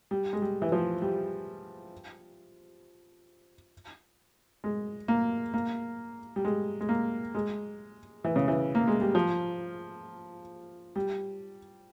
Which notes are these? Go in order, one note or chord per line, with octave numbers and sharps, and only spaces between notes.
G3
G#3
G3
E3
F3
G3
G#3
A#3
A#3
G3
G#3
G#3
A#3
G#3
E3
C#3
E3
A#3
G#3
G3
F3
G3